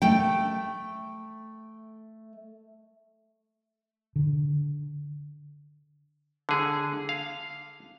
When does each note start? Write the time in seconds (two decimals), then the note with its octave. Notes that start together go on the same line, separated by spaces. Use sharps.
0.02 A3 G5
4.16 D3
6.49 D3 G#4
7.09 F5